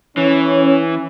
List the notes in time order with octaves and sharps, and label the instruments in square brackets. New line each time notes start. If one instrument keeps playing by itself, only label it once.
[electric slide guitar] E3 [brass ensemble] C#4